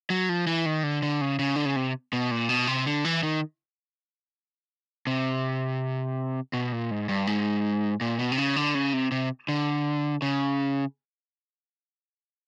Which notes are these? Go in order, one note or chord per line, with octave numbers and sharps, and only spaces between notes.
F#3
F3
E3
D#3
D3
D3
C#3
C#3
D3
C#3
C3
B2
A#2
B2
C3
D3
E3
D#3
C3
B2
A#2
G#2
G2
G#2
A#2
B2
C3
C#3
D3
C#3
C3
C3
D3
C#3